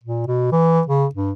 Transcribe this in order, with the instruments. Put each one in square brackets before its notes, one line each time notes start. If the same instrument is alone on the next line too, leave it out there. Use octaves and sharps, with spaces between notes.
[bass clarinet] A#2
B2
E3
C#3
G2